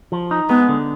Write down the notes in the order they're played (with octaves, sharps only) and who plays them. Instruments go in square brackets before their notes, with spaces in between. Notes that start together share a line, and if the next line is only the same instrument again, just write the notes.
[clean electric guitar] F3
D#4
[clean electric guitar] G#3 [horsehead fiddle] B3
[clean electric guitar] D3